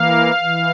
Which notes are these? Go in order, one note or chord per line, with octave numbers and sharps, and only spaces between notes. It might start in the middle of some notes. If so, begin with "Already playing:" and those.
Already playing: E3 A#3 F5
E3